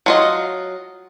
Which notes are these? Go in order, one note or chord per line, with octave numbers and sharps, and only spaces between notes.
F#3 F4 D#5